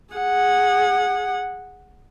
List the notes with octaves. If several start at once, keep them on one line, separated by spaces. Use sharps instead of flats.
G#4 F#5